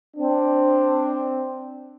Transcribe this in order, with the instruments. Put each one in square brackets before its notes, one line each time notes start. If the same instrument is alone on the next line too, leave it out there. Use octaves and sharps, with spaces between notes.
[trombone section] C4 D4